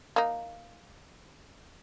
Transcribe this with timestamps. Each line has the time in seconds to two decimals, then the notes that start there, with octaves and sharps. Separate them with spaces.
0.16 A#3 D#4